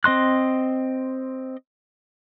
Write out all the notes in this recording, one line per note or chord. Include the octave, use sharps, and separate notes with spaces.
C4 D#5 C6 F#6